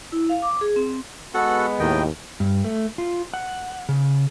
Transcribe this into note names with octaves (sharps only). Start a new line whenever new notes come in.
E4
F5
D6
G#4
C4
G#3 B3 F#4 A4 F#5
D#2 A2 D#3 D#5 G5
G2
A3
F4
F#5
C#3